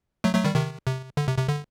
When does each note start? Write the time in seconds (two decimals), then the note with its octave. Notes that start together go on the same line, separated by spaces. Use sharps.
0.24 F#3 A3
0.35 F#3 A3
0.44 D#3 G3
0.55 C3 D#3
0.86 C3
1.17 D3
1.28 C3
1.38 C3
1.48 D3